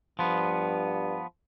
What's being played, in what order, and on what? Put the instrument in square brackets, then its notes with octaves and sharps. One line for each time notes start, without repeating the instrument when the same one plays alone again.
[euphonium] G2 [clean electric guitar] F3 B3